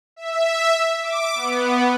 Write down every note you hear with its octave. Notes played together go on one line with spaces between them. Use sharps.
E5
D6
B3